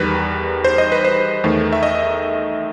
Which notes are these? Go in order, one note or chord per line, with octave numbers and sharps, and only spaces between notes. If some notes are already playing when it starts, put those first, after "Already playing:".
Already playing: E2 D#3 G3 B4
C5
D#5
B4
C5
E2 D#3 A3
E5
D#5